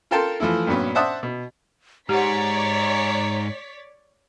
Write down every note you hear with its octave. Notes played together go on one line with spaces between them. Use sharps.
F4 A4 A#4 G5 A5 C6
E3 F3 A3 E4
G2 A#2 F#3 B3 C#4
C5 D5 E5 F#5 A5 D#6
B2
G#2 G4 C#5 D5 F#5 A#5 B6